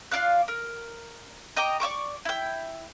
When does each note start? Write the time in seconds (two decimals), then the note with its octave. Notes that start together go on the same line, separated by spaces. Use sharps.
0.11 F4 D5 F5 F#6
0.48 A#4
1.57 D#5 G5 A#5 D6
1.80 D5 E5 C#6 D6
2.25 E4 G5